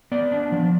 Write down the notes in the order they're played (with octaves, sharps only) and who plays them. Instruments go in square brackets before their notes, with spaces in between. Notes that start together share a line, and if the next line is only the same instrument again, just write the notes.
[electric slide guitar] B3 D5
D4
F3